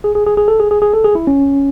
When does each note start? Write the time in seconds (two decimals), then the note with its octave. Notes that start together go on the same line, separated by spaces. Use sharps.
0.04 G#4
0.15 G#4
0.27 G#4
0.37 G#4
0.48 A4
0.60 G#4
0.71 G#4
0.82 G#4
0.93 A4
1.04 G#4
1.15 E4
1.27 C#4